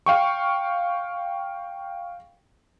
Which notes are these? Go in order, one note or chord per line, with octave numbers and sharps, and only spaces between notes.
F5 G5 C#6